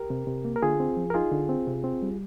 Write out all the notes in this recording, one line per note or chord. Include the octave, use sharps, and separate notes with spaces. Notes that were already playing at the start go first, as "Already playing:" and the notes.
Already playing: G4 A#4
C3
C3
A#3
A#4
D3 F4 G#4
C4
F3
A#4
D#4 F4 G#4
D3
C4
C3
C4
G3